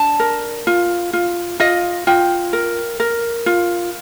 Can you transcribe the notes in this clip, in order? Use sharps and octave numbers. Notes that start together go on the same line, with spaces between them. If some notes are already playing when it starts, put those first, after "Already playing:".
Already playing: D4 A5
A#4
F4
F4
F4 D#5
F4 G5
A#4
A#4
F4